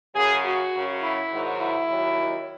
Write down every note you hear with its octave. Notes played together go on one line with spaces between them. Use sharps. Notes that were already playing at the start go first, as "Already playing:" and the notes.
F#2 C#3 F#3 G#4
F#4
F#2 C#3 F#3
E4
G#2 D#3 F#3
E4
D#2 D#3 F#3